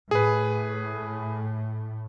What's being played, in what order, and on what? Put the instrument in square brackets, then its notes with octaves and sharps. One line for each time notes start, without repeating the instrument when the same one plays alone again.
[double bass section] A2 [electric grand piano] G#4 B4